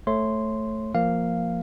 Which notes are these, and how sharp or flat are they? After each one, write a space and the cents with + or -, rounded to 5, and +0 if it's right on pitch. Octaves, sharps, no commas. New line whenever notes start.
A3 +0 C#5 -20 C6 -5
F3 -5 A#3 +0 F5 -5